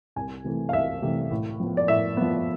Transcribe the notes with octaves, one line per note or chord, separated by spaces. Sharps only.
C2 G#5
C3 E3 A3
F5
C2 E5
C3 E3 A3
A2
F3 B3
D5
A2 E5
F3 B3